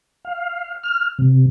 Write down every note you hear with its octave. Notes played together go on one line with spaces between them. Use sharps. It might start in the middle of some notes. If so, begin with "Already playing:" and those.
F5
F6
C3